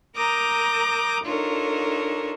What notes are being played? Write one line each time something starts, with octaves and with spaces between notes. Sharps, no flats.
A#4 A#5 D6 D#6 G6 A#6
D4 D#4 F4 A4 A#4 C#5